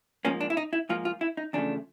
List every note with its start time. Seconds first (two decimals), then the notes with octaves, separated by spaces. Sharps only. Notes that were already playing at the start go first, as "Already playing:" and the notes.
0.25 G#2 F3 A#3 C#4
0.41 D4
0.50 E4
0.57 D#4
0.73 E4
0.89 G#2 F3 A#3 F4
1.05 F4
1.21 E4
1.37 D#4
1.53 E2 C#3 F3 A3 D4